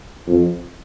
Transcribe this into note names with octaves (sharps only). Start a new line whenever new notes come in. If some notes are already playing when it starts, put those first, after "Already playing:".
F2